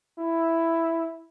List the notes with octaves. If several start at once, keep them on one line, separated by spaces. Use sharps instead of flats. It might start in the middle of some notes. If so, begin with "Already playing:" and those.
E4